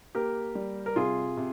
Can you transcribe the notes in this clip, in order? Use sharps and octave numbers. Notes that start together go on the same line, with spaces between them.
A#3 G4 A#4
G3
A#4
C3 F4 G#4
C3